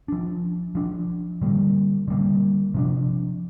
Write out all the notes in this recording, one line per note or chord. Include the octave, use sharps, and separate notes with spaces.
F3 D4
F3 D4
D3 G3 A#3
D3 G3 A#3
C3 F3 D4